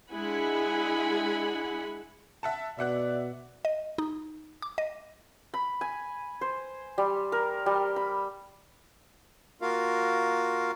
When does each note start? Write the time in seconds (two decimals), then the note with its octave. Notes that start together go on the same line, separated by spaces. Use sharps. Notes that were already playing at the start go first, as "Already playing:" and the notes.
0.12 G#3 D4 E4 F#5 G#5 B5
2.43 E5 F#5 A5
2.79 B2 D5 E5 F#5 F#6
3.65 D#5
3.98 D#4
4.62 D6
4.78 D#5
5.54 B5
5.81 G#5
6.41 C5
6.98 G3
7.32 A#4
7.66 G3
7.96 B5
9.62 A#3 F4 F#4 A#4 F5